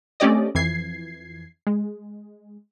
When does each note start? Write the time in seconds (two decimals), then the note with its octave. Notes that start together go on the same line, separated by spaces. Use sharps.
0.20 A3 C4 C#4 G4 D5 D#5
0.55 F2 E3 G#6 C7
1.67 G#3